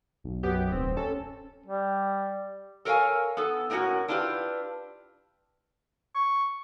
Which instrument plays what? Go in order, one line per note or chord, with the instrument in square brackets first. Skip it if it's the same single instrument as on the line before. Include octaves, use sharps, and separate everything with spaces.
[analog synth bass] B1
[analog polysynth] F#2 B3 G4
[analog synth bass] D1 [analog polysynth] C4
[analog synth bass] C#4 [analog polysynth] A4
[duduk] G3
[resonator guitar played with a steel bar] A4 A#4 C#5 E5 F5 G#5
B3 A4
A2 A3 A#3 C#4 F#4
D4 E4 F4 G4 B4
[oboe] C#6